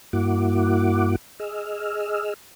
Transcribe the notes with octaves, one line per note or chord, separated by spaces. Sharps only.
G2 A#3 E4 F#4 F#5 D6
G#4 D#5 E6 F6